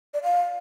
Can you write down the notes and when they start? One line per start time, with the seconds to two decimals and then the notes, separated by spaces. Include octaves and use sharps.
0.14 D5
0.23 F5